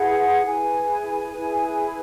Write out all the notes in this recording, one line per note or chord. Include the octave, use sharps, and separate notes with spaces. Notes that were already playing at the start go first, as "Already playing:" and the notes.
Already playing: E4 G#4 B4 F#5
E4 G#4 B4 G#5
E4 G#4 B4